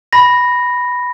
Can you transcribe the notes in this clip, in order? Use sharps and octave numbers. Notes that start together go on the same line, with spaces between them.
B5 A#6